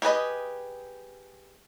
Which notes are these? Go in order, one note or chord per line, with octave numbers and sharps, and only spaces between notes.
G4 G#4 B4 D#5